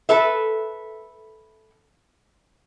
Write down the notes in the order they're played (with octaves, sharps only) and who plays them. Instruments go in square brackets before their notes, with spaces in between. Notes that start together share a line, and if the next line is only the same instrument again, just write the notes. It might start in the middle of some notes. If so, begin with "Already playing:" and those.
[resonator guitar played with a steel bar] A4 B4 E5